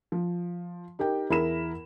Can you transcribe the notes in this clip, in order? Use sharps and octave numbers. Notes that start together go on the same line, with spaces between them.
F3
D#4 G4 A#4 G5
E2 E4 G#4 A#4 B5 E7